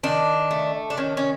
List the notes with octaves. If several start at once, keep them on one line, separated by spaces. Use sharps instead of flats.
D#3 D4
A3
D4
D#3 C#4
C#4